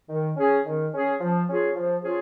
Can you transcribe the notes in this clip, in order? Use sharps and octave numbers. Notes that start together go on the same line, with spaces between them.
D#3
C#4 G#4
D#3
C#4 G#4
F3
C#4 F4 G#4
F3
C#4 F4 G#4